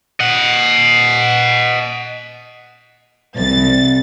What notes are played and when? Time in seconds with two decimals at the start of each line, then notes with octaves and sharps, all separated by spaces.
0.20 D#5 F#5
3.36 C2 A6